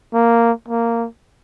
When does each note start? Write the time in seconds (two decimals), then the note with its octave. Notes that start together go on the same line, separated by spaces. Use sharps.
0.13 A#3
0.68 A#3